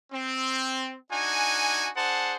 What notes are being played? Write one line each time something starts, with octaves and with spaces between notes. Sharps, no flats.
C4
D4 D#4 F#4 G#5
D4 G#4 C5 F#5 A5